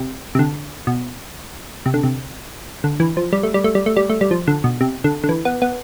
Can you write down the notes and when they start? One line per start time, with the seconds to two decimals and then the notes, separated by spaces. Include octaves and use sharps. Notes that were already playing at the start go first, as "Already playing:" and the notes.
Already playing: C3
0.35 C3
0.39 D3
0.87 B2
1.86 C3
1.94 D3
2.03 C3
2.84 D3
3.00 E3
3.17 F3
3.33 G3
3.43 A3
3.54 G3
3.64 A3
3.75 G3
3.86 A3
3.97 G3
4.10 A3
4.21 G3
4.31 F3
4.48 D3
4.64 B2
4.81 C3
5.04 D3
5.24 D3
5.29 E3
5.45 B3
5.62 B3